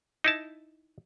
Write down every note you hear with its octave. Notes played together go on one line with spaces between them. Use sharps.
D#4 E4 A5